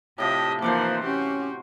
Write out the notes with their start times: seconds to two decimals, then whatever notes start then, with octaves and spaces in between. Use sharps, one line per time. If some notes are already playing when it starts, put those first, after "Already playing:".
0.18 A2 C3 F3 G4 D#5 E5
0.62 E3 F3 A#3 D#4 C5 F#5 D6
1.05 C#4 F#4 G4